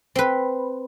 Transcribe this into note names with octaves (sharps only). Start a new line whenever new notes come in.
C4 B4